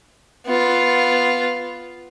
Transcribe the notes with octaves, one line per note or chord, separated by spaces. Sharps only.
B3 F4